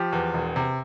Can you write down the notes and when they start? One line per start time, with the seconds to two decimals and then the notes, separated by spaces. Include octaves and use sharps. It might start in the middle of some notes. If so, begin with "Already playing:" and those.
Already playing: F3 G4
0.13 E2
0.34 E1
0.56 C3